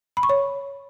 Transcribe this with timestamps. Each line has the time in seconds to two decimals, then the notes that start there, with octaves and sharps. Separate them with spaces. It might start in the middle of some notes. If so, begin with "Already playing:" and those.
0.17 B5
0.23 C#6
0.29 C#5